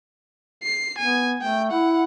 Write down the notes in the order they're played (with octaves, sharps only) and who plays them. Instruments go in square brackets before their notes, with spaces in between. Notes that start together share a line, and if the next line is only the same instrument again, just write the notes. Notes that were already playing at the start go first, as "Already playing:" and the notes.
[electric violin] C7
[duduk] B3 [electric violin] G#5
[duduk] A3 [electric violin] G5
[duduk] E4 [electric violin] F#5